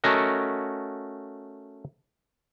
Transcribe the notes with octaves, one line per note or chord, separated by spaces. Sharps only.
A3 C#4 F#4 A#4 D#5 F#5